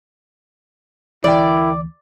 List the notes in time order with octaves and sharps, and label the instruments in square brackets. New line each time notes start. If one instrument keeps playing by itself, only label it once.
[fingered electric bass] D2 E3 [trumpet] E4 [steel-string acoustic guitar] A#4 G5 [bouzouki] D5